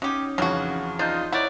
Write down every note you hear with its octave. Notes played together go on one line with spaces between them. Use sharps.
F#3 C#4 D#4 G4
F2 C#3 E3 F#3 F#4
D4 D#4 F4 C5
D#4 E4 C#5 D5 F#5